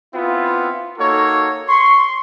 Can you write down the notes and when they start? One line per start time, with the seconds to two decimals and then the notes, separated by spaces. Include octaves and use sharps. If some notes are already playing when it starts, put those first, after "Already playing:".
0.14 B3 C4 E4 F4
0.98 A#3 D#4 F#4 A4 C#5
1.68 C6 C#6